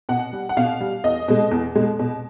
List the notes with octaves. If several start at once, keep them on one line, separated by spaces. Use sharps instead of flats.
B2 F#5
G3
F#5
B2 F5
G3
E2 D#5
B2 G#3
E2
B2 G#3
B2